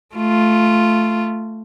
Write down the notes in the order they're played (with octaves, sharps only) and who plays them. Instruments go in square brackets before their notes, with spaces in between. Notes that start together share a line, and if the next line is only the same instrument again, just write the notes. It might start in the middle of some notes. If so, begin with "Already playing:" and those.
[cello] A3 F4